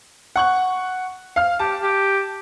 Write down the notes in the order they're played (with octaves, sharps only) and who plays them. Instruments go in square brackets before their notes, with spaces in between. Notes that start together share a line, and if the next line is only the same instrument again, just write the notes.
[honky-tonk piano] F#5 C#6 F#6
F5 F6
[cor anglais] G4 [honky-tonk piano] A5
[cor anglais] G4